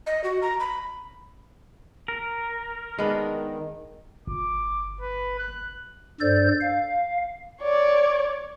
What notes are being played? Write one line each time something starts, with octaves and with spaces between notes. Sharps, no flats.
D#5
F#4
A#5
B5
A#4
D#3 G#3 B3 D4
G1 D6
B4
F#6
G2 A4 C5 D5 G6
F5
C#5 D5